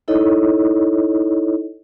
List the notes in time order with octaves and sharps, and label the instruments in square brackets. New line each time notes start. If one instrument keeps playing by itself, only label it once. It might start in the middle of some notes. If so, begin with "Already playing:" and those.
[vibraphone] D#4 E4 A4 C#5 D#5